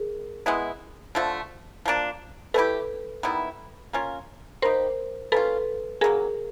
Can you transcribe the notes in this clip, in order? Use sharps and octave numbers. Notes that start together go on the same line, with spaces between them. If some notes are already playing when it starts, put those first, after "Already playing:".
Already playing: G#4 A#4
G#3 B3 E4
D3 F3 A3
F3 A#3 D4
A3 C#4 E4 G4 A4 B4
D#3 G3 B3 E4
A#3 C#4 F4 A#4
G3 A#3 D#4 G4 A#4 C5
A#3 C#4 F4 A4 B4
C#3 F#3 A#3 G#4 A#4